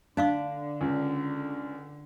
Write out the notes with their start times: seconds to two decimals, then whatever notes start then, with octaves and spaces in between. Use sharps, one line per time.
0.17 D3 D4 D#4 F5 C#6
0.81 C#2